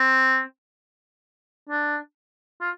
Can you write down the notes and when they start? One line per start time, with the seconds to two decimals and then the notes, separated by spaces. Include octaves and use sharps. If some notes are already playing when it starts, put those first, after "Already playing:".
Already playing: C4
1.69 D4
2.61 F4